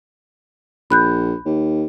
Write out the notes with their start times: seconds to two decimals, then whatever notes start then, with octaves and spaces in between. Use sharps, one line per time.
0.90 A#1 B5 F#6 G6
1.45 D#2